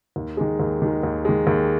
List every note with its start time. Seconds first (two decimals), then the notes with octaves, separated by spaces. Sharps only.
0.16 D#2
0.37 D#3 G#3
0.60 D#2
0.82 D#3 G#3
1.03 D#2
1.25 D#3 G#3
1.47 D#2